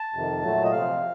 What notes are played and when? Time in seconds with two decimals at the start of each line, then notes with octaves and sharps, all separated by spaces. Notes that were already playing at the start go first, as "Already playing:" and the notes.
Already playing: A5
0.13 F2 C3 D#3
0.43 A#2 F#3 A3
0.64 D#5
0.72 C3 F3 C4 F5